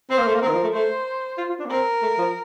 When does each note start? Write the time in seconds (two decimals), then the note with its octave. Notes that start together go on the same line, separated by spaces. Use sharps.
0.10 C4 C5
0.19 A#3
0.27 A3
0.34 A#3
0.42 C4 A#4
0.48 D#3
0.53 F3
0.63 A3
0.74 A3 C5
1.38 F4
1.49 F4
1.59 D4
1.66 A#3
1.70 C4 A#4
2.02 A3
2.18 F3